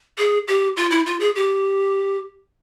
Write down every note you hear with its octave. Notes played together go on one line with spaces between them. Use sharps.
G#4
G4
F4
E4
F4
G#4
G4